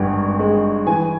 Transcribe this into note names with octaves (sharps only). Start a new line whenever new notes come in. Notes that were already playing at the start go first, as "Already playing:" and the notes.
Already playing: G#1 G2
G#3
E3 G#5